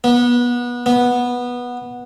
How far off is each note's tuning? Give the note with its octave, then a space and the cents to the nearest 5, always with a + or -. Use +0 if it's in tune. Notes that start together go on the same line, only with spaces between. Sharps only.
B3 -25
B3 -10